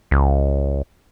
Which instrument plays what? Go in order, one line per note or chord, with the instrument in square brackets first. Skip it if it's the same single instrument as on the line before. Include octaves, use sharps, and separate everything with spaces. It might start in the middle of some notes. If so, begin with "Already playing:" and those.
[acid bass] C#2